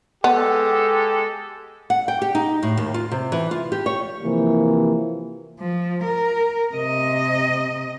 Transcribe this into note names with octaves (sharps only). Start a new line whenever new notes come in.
G#3 B3 G4 A4
F#5
G5
G4
D#4
A2
D#2
F4
C3
E3
F4
G4
C#5
C3 E3 F3 A#3
F3
A#4
C3 D#5